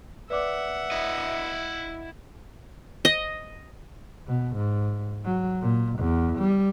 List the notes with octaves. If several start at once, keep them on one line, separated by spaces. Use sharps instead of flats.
B4 D5 E5 F#5 D6
E4 D#5
D#5
B2
G#2
F#3
A#2
E2
G3